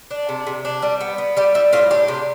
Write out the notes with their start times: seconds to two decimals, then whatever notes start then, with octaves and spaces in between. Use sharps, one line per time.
0.11 D4
0.29 C3
0.47 C3
0.65 D4
0.82 G3
1.01 B3
1.18 B3
1.37 G3 G4
1.55 G3 E4
1.73 A2 F4
1.91 D4 G4
2.08 C3